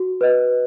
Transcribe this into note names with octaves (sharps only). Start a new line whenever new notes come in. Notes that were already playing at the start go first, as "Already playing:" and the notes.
Already playing: F#4
B4 D#5